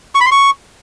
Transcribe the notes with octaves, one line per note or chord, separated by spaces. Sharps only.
C#6
B5
C6
C#6